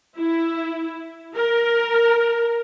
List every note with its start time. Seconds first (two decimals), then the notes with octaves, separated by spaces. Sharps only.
0.17 E4
1.35 A#4